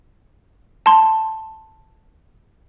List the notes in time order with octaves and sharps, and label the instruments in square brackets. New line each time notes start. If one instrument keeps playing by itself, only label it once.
[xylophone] A5 C6